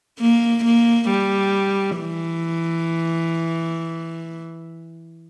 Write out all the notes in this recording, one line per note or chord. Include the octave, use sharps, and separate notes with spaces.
A#3
A#3
G3
E3